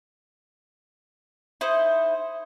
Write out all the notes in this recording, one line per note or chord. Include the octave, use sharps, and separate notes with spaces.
D#4 E4 C5